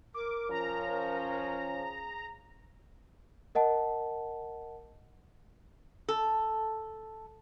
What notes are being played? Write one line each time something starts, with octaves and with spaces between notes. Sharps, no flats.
A#4 D6
F3 C#4 A#5
G#4
A#4 D#5 F#5 A5
A4